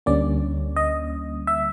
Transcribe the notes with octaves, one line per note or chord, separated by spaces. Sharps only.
D2 D3 G3 A#3 C#4 D5
D#5
E5